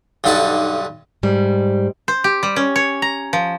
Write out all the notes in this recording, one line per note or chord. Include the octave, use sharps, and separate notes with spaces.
B1 G2 D3 D#4 F#5 A5
G#2 G3
C5
G4
G3
C#4
C#5
A#5
F3